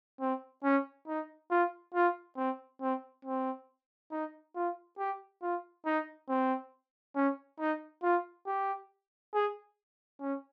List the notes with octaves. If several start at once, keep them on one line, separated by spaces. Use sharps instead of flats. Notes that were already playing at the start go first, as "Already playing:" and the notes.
C4
C#4
D#4
F4
F4
C4
C4
C4
D#4
F4
G4
F4
D#4
C4
C#4
D#4
F4
G4
G#4
C#4